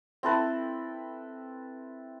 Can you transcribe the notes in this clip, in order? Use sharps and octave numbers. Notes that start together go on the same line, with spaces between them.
C4 E4 A4 B4